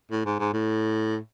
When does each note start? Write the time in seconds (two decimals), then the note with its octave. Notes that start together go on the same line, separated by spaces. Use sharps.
0.11 A2
0.26 G#2
0.39 G#2
0.53 A2